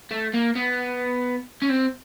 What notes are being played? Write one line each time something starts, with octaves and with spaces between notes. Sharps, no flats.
A3
A#3
B3
C#4
C4